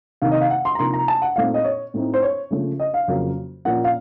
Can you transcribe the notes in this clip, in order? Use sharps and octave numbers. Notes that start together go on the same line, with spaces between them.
C3 D#3 A#3 D#4 F5
D#5
F5
F#5
C6
A#5
C3 F3 A#3 D#4 C6
A#5
A5
F#5
A#2 A3 C4 D#4 F5
D#5
C#5
A2 A3 C4 D#4
C5
C#5
C#3 F3 A3 C#4
D#5
F5
F2 C#3 F#3 A#3
A#2 F3 A#3 C#4 F#5
F5